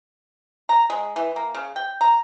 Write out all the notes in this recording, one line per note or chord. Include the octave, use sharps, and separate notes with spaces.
A#5
G#3
E3
A#3
C#3
G5
A#5